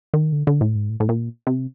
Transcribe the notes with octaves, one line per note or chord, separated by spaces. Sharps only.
D#3
D3
D3
A2
G#2
A2
A2
A#2
C3